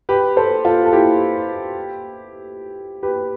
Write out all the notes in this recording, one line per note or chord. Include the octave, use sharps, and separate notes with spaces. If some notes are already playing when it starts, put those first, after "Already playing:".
G4 B4
A4 C5
F4 A4
A4
E4 G4
G4 B4